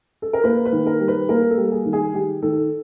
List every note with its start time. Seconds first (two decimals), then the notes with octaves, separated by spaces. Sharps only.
0.22 A4
0.33 A#4
0.44 A#3 B4
0.65 B4
0.72 D#3
0.86 A#4
1.00 G3
1.08 B4
1.29 A#3 A#4
1.51 A4
1.57 G3
1.72 G#4
1.86 D#3
1.93 G#4
2.14 D#3 G4
2.42 D#3 A4